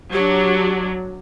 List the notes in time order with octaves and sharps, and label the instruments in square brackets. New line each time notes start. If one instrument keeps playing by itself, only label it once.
[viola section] F#3 D4 [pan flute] G4